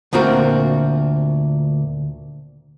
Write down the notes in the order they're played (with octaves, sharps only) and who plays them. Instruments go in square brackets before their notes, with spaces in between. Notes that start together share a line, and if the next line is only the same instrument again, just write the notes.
[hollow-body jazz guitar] D2 A#2 C4 F#4 A#4